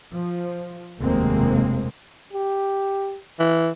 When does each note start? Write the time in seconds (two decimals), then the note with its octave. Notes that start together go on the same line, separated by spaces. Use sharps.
0.13 F3
1.00 F1 D#2 B2 G#3 A#3 C4
2.33 G4
3.40 E3